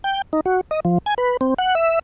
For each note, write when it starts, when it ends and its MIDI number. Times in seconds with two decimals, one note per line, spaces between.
0.04 0.22 79
0.33 0.41 63
0.46 0.61 66
0.71 0.80 75
0.85 0.98 53
1.06 1.14 80
1.18 1.37 71
1.41 1.54 60
1.58 1.75 78
1.75 1.99 76